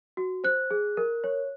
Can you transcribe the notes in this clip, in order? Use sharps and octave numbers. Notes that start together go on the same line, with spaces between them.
F#4
C5 F#6
G#4
A#4
C#5